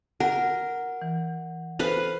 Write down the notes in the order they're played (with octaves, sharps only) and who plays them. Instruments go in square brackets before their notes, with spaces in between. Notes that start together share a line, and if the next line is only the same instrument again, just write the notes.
[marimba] F#4 [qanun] A#4 [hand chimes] F#5
[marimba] E3
[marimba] A4 C5 [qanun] B4 F5